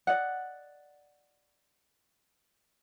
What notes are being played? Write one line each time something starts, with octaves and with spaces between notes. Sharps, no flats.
D5 D#5 F#5